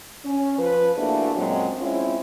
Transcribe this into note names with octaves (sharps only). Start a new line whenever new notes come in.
C#4
F3 B4
A3 A#3 D4 E4 F#4 G#4
F#2 A#2 F#3 G#3 C4
G#3 C4 C#4 E4 F4